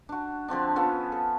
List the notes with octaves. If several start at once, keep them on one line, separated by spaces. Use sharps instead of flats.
D4 F#4
D3 F3 C4 D4
F3 B3 C#4 A4
A4